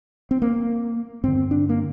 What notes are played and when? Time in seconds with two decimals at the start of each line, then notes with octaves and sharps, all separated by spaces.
0.31 C4
0.42 A#3
1.23 G2 D3 C4
1.51 D4
1.69 A#3